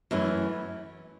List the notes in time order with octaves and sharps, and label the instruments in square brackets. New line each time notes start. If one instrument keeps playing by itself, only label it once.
[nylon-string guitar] F#2 E3 A3 C#4